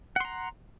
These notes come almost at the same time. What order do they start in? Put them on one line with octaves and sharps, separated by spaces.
F#5 C6 A#5